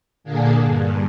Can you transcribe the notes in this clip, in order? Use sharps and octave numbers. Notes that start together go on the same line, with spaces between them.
A#2 D3 A#3 D4 G#4
G2